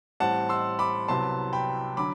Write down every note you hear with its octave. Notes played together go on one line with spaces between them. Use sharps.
A1 A2 G3 C4 F#5 A5
C6 E6
B5 D6
C2 C3 F#3 B3 A5 C6
G5 B5
D3 F#3 B5 D6